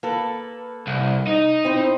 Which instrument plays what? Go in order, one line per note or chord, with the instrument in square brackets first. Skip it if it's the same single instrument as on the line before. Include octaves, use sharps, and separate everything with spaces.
[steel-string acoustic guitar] A#3 A4 B4
[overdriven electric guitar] C2
D#4
[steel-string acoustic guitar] C4 E4 C5